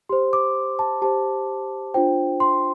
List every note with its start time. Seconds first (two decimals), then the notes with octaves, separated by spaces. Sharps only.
0.09 G4 C5 C6
0.33 D6
0.79 A5
1.02 G4 C5 A5
1.94 D4 F4 C5 G5
2.40 C6